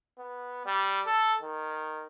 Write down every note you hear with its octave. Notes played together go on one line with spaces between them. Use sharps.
B3
G3
A4
D#3